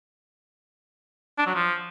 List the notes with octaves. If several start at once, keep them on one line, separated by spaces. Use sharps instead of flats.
D4
F#3
F3